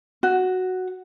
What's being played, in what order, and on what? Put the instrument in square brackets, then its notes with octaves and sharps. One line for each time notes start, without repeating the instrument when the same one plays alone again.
[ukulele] F#4